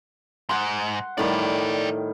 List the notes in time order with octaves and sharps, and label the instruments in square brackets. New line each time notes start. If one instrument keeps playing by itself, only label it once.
[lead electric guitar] G#2 [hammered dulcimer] F#5 C6
[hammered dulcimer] A2 D#3 G3 [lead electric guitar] G#4 D5